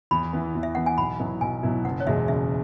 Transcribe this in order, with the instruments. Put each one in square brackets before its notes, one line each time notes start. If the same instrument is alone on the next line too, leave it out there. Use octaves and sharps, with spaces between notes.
[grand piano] E2 [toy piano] B5
[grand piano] E3 B3
E2
[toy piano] E5
[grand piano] E3 B3 [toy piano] F#5
[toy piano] G#5
[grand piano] B1 [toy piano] B5
[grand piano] B2 F#3 B3 E4
[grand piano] B1 [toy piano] G#5
[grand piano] B2 F#3 B3 E4
[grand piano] F#1 [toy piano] F#5
[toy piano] C#5
[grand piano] E2 B2 G#3 [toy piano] E5
[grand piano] F#1 [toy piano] E5